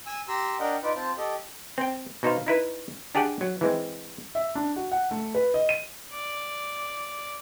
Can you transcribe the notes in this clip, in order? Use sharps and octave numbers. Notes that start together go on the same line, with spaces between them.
G#5 E6
G4 A#5 C6 E6
D4 A#4 D#5 F#5 G5
D#4 F4 B4 D5
C4 F4 C5 A5
G4 A4 D#5
C4 G5
B2 D#4 C5 F5
D#4 E4 B4
D4 G4 G#4 D5 F#5 G5
F#3
E3 G#3 C4
E5
D4
F#4
F#5
A3
B4
D#5
D#7
D5